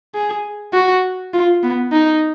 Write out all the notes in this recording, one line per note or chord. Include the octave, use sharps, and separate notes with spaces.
G#4
F#4
F4
B3
D#4